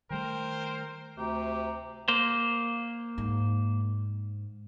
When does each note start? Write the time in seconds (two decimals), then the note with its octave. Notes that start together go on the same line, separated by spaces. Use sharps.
0.10 D#3 G3 A3 A#4 C5 G5
1.18 D2 C3 G4 A#5
2.08 A#3 C5
3.18 G#2